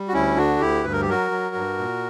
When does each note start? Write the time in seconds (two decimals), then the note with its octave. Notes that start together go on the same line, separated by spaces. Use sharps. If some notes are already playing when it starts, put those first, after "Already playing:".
Already playing: G3
0.08 F#4
0.13 D2 C#4 E4
0.36 D3 D4 F#4
0.60 D2 E4 G4
0.84 G2 B4
0.92 A#4
1.01 G4
1.07 F#3 F#4 A#4
1.31 F#3
1.55 G2
1.78 A#2